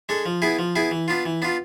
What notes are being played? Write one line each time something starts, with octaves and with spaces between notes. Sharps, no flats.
G#3 D4 A4
F3
B3 E4 G#4
F3
B3 E4 G#4
E3
B3 D4 F4
E3
B3 D4 F4